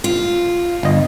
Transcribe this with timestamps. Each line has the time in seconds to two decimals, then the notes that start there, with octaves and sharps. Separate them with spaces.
0.04 F4
0.83 G1 D#5